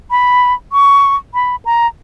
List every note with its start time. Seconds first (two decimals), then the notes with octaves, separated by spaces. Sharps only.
0.11 B5
0.72 C#6
1.34 B5
1.65 A#5